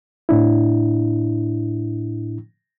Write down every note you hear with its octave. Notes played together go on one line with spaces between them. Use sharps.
A2 D4 E4